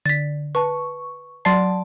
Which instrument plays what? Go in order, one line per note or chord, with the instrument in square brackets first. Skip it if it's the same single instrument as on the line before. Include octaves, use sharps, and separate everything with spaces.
[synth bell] D3 [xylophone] A6 B6
[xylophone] B4 A5 [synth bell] C#6
[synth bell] F#3 D5 A5 [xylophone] C6 A6 C7